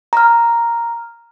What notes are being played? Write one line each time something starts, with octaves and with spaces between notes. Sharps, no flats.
A#5 F6